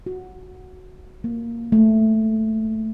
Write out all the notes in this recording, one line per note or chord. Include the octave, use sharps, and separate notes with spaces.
F#4
A#3
A3